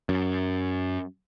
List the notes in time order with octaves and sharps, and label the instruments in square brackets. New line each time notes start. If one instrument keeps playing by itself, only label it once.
[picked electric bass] F#2